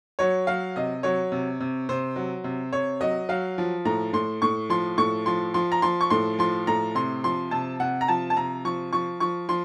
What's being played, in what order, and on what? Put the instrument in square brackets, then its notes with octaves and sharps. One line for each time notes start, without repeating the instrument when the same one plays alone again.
[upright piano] F#3 C#5
F#3 F5
C3 D#5
F#3 C#5
C3
C3
C3 C5
F#3
C3
C3 C#5
F#3 D#5
F#3 F5
F3
A2 A#5
A2 C6
A2 C#6
F3 C6
A2 C#6
F3 C6
F3 C6
A#5
F3 C6
C#6
A2 C6
F3 C6
A2 A#5
C3 C6
F3 C6
C3 A5
C3 F#5
A#5
F3 A5
A5
C3 A#5
F3 C#6
F3 C#6
F3 C#6
F3 C6